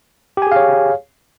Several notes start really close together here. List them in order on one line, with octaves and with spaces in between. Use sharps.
G4 G#5 G#4 F5 C#5